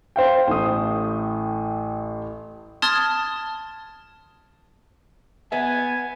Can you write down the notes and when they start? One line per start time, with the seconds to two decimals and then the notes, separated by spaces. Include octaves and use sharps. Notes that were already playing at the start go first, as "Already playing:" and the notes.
0.16 C5 F5 G5
0.47 A1 A2 D#6
2.82 A5 C6 D#6 F6 G#6 A6
5.52 B3 E5 G#5